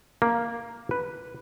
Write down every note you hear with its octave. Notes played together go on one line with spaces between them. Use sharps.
A#3
B4